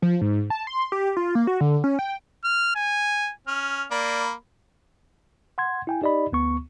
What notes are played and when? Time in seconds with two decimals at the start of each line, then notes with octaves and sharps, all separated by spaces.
0.02 F3
0.21 G#2
0.50 A5
0.67 C6
0.92 G4
1.17 F4
1.35 A#3
1.47 F#4
1.61 D3
1.84 C#4
1.99 G5
2.44 F6
2.75 G#5
3.47 C#4 F6
3.91 A#3 D5 B5
5.58 F#5 C6 G#6
5.87 E4 G5 G#5
6.02 D#4 G4 D5 D#5 B5
6.32 D2 B3 C#6